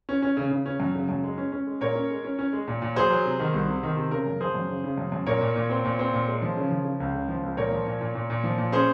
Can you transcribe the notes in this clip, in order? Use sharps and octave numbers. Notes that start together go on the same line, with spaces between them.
C#4
C#4
C#3
C#3
C#4
F#2
C#3
F#2
G#3
C#4
C#4
G#3
A#2 A#4 C#5
C#4
G#3
C#4
C#4
G#3
A#2
A#2
F#3 G#4 C5
F#3
C3
D#3
C2
C3
D#3
C3
C#3 A#4
F#2
F3 G#4 C5
F#2
C#3
C#3
F#2
F#2
A#2 A#4 C#5
A#2
A#2
C4
A#2
C4
A#2
G#3
F3
C#3
F3
C#3
C#2
C#3
F3
C#2
A#2 A#4 C#5
F3
A#2
A#2
A#2
A#2
F3
A#2
C#4 G#4 C5